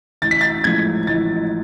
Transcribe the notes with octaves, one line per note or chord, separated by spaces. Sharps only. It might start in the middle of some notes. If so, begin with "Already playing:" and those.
A1 A6
B6
A6
A2 F3 G#3 G#6
A1 A6